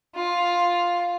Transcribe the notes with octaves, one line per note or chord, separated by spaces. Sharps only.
F4